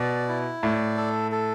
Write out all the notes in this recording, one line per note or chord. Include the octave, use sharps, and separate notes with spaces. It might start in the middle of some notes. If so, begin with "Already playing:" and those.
Already playing: B2 D5
E4
A2 D5
A4
A4